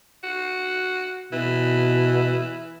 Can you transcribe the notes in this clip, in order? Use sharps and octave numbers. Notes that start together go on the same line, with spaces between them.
F#4
B2 E3